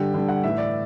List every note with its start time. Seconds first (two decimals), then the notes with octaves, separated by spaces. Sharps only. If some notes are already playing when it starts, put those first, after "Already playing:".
Already playing: G2 D3 G4
0.14 G2 D3
0.29 F#5
0.43 A2 E3 E5
0.58 D5